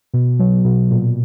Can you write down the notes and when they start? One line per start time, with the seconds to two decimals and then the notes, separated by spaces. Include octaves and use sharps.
0.14 B2
0.39 F#3
0.65 B2
0.91 A#2